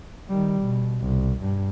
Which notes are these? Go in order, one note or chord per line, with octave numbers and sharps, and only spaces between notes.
D#3 G3
B2
C2
G2